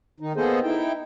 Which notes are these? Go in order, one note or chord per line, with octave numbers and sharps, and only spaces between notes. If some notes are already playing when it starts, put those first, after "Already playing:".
D#3 D#4
A#3 B3 G#4 A4 C5 D#5
D#4 E4 G5